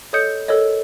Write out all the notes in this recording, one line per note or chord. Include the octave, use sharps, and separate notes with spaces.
A4 C#5 D#5 D#6 G6 C#7
A4 A#4 C#5 D#5